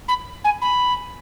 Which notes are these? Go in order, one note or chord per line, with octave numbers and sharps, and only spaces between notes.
B5
G#5
B5